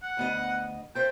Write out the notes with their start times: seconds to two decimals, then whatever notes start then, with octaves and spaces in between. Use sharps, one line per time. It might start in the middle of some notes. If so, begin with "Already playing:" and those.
0.03 F#5
0.17 D2 B3 D#5
0.95 A4 C5 E5 G5